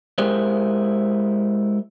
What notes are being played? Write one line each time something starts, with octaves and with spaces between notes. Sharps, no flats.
G#3 E4 G4 G#4 A#4 C5